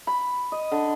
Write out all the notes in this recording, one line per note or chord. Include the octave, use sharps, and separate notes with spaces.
B5
D#5
D3